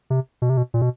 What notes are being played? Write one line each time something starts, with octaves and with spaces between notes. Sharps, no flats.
C3
B2
C3
B2
A#2
B2